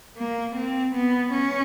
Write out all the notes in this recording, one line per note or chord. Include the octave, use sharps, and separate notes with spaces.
A#3
C4
B3
C#4